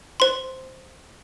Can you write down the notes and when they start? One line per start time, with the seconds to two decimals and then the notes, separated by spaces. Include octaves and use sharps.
0.20 C5 C6